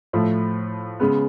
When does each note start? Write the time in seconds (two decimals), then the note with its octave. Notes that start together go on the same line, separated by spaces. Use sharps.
0.13 A2 F3 A3
1.00 C#3 G#3 B3